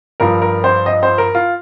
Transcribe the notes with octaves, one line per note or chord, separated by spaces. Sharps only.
G2 F3 A#4
A#4
C5
D#5
C5
A#4
F4